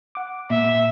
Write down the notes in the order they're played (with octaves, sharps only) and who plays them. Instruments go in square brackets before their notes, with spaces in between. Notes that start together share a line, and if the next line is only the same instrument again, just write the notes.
[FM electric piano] F#5 D6
[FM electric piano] A#2 [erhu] E5